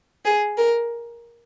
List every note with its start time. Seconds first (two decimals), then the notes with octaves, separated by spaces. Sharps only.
0.25 G#4
0.57 A#4